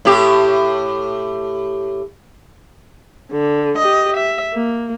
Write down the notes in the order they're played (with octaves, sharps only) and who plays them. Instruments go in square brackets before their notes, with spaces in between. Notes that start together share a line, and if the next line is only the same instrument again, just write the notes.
[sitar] A2 G4
[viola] D3
G4 D#5
E5
A#3